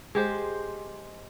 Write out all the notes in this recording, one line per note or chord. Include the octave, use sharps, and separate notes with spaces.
G#3 G4 C5